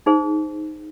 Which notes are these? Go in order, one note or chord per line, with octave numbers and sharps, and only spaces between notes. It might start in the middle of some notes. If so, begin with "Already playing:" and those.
D#4 G#4 C5